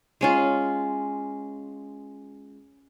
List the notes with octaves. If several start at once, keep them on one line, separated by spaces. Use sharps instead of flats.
G#3 C#4 F4